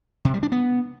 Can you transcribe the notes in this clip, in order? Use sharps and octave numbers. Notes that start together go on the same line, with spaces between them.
C3
G3
D4
B3